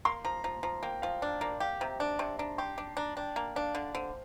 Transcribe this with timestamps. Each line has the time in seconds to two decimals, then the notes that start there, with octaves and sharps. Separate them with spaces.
0.05 A#3 C6
0.25 F3 A#5
0.44 F3 A#5
0.63 F3 A#5
0.83 A#3 G5
1.02 F3 F5
1.22 D4 F5
1.41 A#3 D5
1.60 G4 F5
1.80 C3 A#5
2.00 D4 D6
2.19 C3 C6
2.39 D4 A#5
2.58 G4 C6
2.77 D4 D6
2.97 D4 A#5
3.17 D4 G5
3.36 A#3
3.56 D4 F5
3.75 D3
3.95 D3 C5